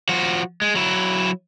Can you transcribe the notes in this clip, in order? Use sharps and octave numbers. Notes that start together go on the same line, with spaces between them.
F3 F#4
G#3
F#3 E4